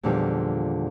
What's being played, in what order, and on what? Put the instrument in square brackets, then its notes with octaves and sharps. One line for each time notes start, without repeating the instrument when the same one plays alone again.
[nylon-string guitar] E2 A#2 D3 D#3 F3 G3